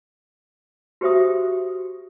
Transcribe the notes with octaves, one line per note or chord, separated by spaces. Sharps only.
F#4 G4 C5 E5 D#6